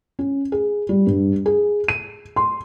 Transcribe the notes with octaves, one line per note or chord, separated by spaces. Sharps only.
C#4
G#4
G3
G2
G#4
D#7
C6